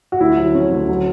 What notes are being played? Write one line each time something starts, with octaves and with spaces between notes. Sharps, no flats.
F#4
D2 E4
F#3
C#4
D2
F#3